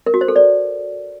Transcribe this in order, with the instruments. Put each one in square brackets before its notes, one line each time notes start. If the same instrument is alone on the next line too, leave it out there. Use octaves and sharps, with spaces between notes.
[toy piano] A#4
F#4
C5
A4
D5